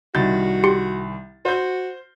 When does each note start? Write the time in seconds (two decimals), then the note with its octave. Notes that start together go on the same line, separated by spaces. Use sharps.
0.15 C2 D#3 F#4 G6 A6
0.64 G4 C6 C#7
1.45 F#4 C5 G6